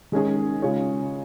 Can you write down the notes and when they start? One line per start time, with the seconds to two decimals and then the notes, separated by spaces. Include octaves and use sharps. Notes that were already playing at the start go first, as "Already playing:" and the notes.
0.12 D#3 G#3 C#4 G#4
0.62 C#3 G#3 F4 G#4 C#5